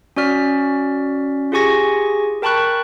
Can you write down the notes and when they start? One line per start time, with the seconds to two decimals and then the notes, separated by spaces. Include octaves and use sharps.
0.17 C#4 F#4 D5 F6 B6
1.52 F4 G4 G#4 G#5 C#6 A#6
2.42 A#4 G5 A5 B5 C#6 F#6